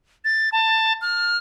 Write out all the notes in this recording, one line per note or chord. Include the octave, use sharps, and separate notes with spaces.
A6
A5
F6